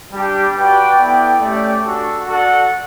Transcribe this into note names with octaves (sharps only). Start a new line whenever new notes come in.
G3 D4 G4
F#4 B4 D5 G5
B3 E4 A4 D5 G5
A3 C#4 G4 D5
D4 F#4 A4
F#4 A4 D5 F#5